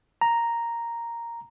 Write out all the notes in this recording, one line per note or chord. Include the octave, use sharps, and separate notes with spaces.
A#5